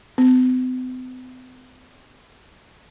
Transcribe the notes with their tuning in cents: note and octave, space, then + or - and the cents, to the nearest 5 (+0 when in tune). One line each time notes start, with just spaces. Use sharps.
C4 -45